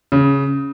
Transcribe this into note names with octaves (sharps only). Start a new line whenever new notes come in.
C#3